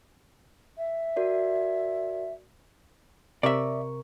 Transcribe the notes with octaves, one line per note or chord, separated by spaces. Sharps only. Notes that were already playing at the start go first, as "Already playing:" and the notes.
E5
F#4 A#4 D5
C3 A#4 D5 E5 C#6